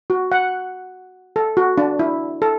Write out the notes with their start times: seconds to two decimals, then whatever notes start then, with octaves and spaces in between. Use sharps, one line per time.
0.10 F#4
0.32 F#5
1.36 A4
1.57 F#4
1.78 D4
1.99 E4
2.42 A4